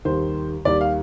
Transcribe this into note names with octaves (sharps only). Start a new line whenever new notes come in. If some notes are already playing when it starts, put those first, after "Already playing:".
D#2 D#3 G3 C5
D#2 D#3 G3 D5
F5